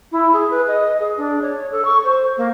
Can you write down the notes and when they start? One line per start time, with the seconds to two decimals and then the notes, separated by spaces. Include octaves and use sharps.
0.12 E4
0.33 G#4
0.51 B4
0.68 D#5
1.00 G#4
1.18 D4
1.42 C#5
1.72 A4
1.85 C#6
2.04 C5
2.37 A#3